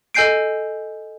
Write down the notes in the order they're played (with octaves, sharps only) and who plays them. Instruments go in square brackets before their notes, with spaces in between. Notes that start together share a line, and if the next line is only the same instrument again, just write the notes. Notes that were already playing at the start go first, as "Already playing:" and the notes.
[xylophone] A4 D#5 G#5 G6 C7 D7